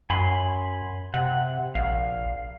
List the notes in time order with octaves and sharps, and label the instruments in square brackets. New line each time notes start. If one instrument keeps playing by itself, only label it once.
[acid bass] F#2 [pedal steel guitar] G#5 B5 C6
[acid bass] C3 [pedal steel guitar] F#5
[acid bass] A#1 [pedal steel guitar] F5